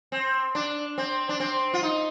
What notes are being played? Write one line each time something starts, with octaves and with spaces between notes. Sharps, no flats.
C4
D4
C4
D4
C4
F4
D#4